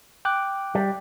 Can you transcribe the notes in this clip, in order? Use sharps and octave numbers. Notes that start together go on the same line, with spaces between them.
G5 D6 F#6
G3